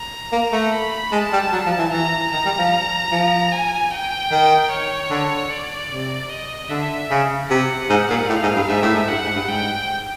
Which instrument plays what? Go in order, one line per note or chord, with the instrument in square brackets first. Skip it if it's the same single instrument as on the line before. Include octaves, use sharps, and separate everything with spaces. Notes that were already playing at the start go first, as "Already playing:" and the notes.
Already playing: [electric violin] A#5
[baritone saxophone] A#3
A3
[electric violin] B5
[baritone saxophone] G#3 [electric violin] A5
[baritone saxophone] G3
F#3
F3
E3
[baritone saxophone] E3 [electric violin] A#5
[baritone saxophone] D#3 [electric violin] A#5
[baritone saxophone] G3
F3
F3
[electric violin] G#5
G5
[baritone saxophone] D#3
[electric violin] C#5
[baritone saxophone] D3
[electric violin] D5
[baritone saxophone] C3
[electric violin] D#5
[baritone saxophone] D3 [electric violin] E5
[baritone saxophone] C#3
[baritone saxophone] C3 [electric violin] F#5
[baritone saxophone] G#2
A#2
[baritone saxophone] A2 [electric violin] F5
[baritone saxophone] G#2
G2
[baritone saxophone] G#2 [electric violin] E5
[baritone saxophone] A2
G#2
[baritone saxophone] G2 [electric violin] F#5
[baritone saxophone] G#2
G2
[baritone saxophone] G#2 [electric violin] G5